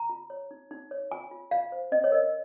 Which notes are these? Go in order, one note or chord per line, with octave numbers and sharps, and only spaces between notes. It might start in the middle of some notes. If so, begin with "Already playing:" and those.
Already playing: A#5
F4
C#5
D#4
D#4
C#5
F4 G#5
F4
F4 F5
C5
C#4 D#5
C#5
A#4 D#5